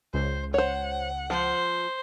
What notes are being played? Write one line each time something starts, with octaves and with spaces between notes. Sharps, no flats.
C#2 C5
C5 C#5 F#5
F3 C5